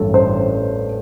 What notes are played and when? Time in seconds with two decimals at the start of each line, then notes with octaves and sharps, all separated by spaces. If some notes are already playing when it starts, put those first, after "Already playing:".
Already playing: A1 G2 A4
0.14 C5